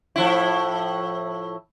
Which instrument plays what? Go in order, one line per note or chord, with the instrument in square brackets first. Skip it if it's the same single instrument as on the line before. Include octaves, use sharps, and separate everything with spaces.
[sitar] A2 F3 E4